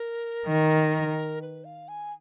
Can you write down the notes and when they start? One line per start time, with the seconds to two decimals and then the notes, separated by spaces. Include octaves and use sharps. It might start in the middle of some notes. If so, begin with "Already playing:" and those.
Already playing: A#4
0.47 D#3
1.42 B4
1.65 F5
1.88 G#5